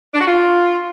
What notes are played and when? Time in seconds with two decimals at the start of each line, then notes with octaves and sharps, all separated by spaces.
0.14 D4
0.21 F#4
0.27 F4